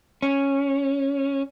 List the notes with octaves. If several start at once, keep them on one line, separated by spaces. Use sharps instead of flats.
C#4